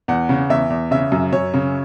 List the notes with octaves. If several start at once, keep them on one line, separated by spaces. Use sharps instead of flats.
E2 F#5
C#3
E2 E5
E2
C#3 E5
F#2
F#2 C#5
C#3